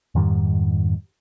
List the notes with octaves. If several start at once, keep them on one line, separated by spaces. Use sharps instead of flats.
F2 G#2 D#3 G3